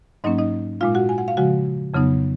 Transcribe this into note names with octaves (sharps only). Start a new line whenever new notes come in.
G#2 F#3 A#3 C#4 D#4 D#5
D#4 D#5
A#2 G#3 D#4 F4 F5
F#4 F#5
G#5
F#5
F5
C#3 F3 G#3 F#4 F#5
F2 C#3 F#3 B3 D#4